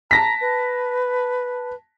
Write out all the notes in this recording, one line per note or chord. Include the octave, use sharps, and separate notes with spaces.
A5 A#5 A#6 B6
B4